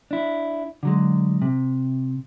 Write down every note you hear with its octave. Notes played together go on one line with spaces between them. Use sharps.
D4 E4
D3 F#3 G#3
C3